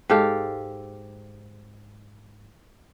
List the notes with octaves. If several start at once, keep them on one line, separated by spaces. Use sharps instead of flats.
G#2 G4 A4 F5